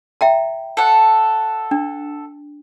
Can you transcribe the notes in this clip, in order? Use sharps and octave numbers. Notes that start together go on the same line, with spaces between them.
E5 G5 A#5
A4 F#5
D4